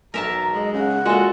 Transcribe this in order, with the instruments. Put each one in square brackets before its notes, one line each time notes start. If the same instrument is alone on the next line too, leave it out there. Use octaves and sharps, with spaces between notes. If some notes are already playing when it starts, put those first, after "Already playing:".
[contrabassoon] B1 [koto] A#4 E5 A5 [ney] A#5
[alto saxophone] G#3 [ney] D#5
[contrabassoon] C#3 [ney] F#5
[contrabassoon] A#2 [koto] G#3 A4 [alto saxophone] F#4